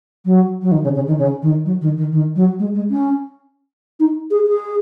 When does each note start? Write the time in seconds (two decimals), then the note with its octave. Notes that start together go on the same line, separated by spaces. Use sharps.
0.25 F#3
0.62 F#3
0.72 D#3
0.83 C#3
0.95 C#3
1.07 D#3
1.19 C#3
1.42 D#3
1.65 F#3
1.81 D#3
1.97 D#3
2.12 D#3
2.36 F#3
2.59 G#3
2.74 G#3
2.90 C#4
4.00 D#4
4.31 G#4
4.48 G#4